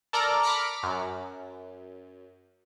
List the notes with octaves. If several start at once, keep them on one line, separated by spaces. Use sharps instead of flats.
A4 A#4 D5 A#5 D6
B5 D6 F6 A#6 B6 C#7
F#2